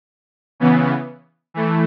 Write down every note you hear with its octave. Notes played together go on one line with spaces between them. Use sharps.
C#3 E3 B3
E3 A3